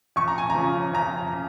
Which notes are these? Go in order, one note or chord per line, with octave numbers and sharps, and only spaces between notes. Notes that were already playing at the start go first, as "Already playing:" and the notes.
F2 C#6
A#5
G#5
A#5
C#3 F3
F2 A#5
C#3